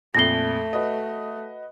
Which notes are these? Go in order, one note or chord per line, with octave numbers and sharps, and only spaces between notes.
A#1 F2 A3 A#6 C7 G7
F#4 B4 D#5